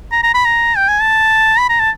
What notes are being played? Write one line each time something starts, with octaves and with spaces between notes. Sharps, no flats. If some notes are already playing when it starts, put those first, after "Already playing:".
A#5
A#5
B5
A#5
G5
G#5
A5
B5
A#5
A5